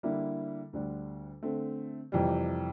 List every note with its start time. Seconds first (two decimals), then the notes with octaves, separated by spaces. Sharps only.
0.03 D3 G3 A#3 E4
0.73 D2 D3 G3 D4
1.43 D3 A3 C4
2.12 F2 C3 E3 G3